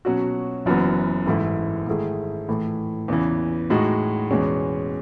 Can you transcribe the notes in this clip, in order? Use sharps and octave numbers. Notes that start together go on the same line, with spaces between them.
B2 F#3 C#4 F#4
F#1 F#2 E3 B3
A1 G#2 E3 A3 E4
G#2 D#3 A3 E4 G#4
A2 E3 A3
E2 C#3 E3
A2 G#3 D#4 F#4
E2 B2 G#3 C#4